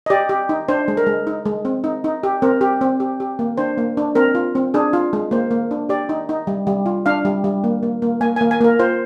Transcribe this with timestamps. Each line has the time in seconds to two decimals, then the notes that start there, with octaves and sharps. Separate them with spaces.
0.06 D#5
0.10 G4 D5
0.29 G4
0.49 D#4
0.69 D4 C5
0.88 G#3
0.97 A#4
1.06 G#3
1.27 D#4
1.45 G#3
1.65 C4
1.84 D#4
2.04 D#4
2.23 G4
2.42 C4 A#4
2.61 G4
2.81 C4
3.00 G4
3.20 G4
3.39 A#3
3.58 D4 C5
3.78 A#3
3.97 D4
4.15 C4 A#4
4.35 F4
4.55 C4
4.74 D4 G#4
4.93 F4
5.13 G#3
5.31 A#3 C5
5.51 A#3
5.71 D4
5.89 G4 D5
6.09 D#4
6.29 D#4
6.47 G3
6.67 G3
6.86 F4
7.06 D4 F5
7.25 G3
7.44 G3
7.64 A#3
7.83 A#3
8.02 A#3
8.21 A#3 G#5
8.36 A#3 G#5
8.51 G#5
8.61 A#3 A#4
8.79 F4 C5